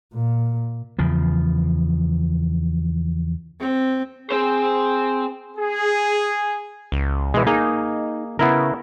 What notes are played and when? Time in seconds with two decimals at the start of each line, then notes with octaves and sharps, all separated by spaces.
0.14 A#2
0.99 E2 C#3 F3
3.60 C4
4.31 C4 G#4 C5
5.57 G#4
6.92 C#2
7.34 B2 E3 G#3
7.47 A#3 D#4 G#4
8.39 C#3 B3 E4 A#4